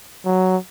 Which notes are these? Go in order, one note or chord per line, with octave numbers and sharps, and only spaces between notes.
F#3